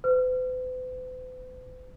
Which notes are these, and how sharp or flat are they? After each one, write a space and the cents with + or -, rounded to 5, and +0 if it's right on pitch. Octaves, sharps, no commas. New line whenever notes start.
B4 +45